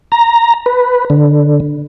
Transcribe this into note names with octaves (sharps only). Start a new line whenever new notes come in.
A#5
B4
D3